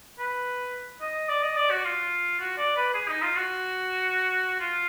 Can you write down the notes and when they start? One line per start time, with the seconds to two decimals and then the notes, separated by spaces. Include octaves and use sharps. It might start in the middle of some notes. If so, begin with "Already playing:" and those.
0.19 B4
1.01 D#5
1.29 D5
1.43 D#5
1.57 D5
1.70 F#4
1.84 F4
2.40 F#4
2.58 D5
2.76 B4
2.94 G#4
3.08 D#4
3.22 F4
3.36 F#4
4.60 F4